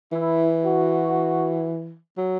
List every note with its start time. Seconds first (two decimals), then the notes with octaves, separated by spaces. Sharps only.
0.12 E3 E4
0.64 F#4
2.18 F#3